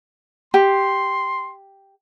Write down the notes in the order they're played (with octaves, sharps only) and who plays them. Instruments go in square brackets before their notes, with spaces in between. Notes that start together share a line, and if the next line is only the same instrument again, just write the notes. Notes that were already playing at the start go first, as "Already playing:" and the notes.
[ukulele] G4 [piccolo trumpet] C6